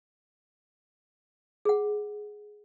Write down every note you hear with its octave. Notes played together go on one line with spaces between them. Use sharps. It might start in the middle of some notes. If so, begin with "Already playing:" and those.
G#4 F#5